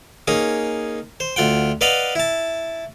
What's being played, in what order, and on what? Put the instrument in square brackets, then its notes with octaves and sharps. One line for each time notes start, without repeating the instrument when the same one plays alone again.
[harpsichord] A#3 C#4 D#4 G#4
C5
D2 F4 F#5 G5
B4 D5 D#5 F5 F#5 B5
E4 A5